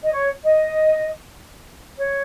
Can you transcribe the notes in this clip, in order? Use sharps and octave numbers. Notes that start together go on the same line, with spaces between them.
D#5
C#5
D#5
C#5